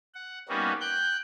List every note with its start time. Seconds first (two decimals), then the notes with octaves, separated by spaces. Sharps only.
0.14 F#5
0.49 G3 A#3 B3 C#4 D#4 F#4
0.80 G5 F#6 G6